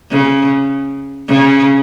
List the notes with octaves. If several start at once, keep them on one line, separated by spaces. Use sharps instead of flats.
C#3
C#3